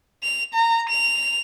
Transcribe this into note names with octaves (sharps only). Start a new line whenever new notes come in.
F7
A#5
F7